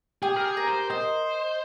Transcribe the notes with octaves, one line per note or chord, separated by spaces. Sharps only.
G4 G#4
A#4
G#4
A#4
C5
C5 D#5